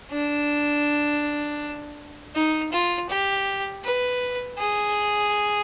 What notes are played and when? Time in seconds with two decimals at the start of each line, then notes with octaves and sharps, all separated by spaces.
0.11 D4
2.35 D#4
2.72 F4
3.09 G4
3.84 B4
4.58 G#4